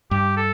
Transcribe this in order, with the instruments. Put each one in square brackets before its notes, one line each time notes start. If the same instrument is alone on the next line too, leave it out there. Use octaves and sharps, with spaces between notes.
[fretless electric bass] G2 [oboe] G4
[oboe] A4